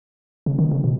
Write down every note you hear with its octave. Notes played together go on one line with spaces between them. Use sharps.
C#3
D#3
C#3
B2